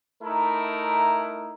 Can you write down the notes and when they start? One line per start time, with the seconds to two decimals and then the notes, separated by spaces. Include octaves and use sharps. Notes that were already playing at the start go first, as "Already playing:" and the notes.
0.23 A3 D#4 E4 A#4